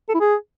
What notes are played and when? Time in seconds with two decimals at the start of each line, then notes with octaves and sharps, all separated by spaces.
0.09 A4
0.14 E4
0.20 G#4